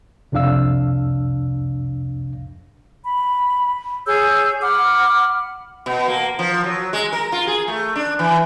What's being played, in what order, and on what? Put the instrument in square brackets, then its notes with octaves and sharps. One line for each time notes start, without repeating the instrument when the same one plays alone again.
[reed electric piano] C2 F2 C3 D4 F5 E6
[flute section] B5
G#4 C#5 E6 G6
F#5 B5 D6 F6
[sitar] B2
A#3
F3
F#3
G#3
A#4
F4
G#4
A3
D4
E3